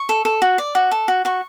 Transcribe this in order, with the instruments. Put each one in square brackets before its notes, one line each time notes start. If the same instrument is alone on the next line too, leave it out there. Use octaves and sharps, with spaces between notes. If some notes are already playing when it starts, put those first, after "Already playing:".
Already playing: [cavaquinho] C#6
A4
A4
F#4
D5
F#4
A4
F#4
F#4 C#6